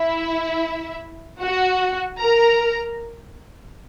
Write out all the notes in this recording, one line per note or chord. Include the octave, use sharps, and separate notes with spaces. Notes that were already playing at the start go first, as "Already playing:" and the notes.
Already playing: E4 E5
F#4 F#5
A#4 A#5